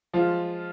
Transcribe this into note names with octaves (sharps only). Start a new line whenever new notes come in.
F3 G#3 F4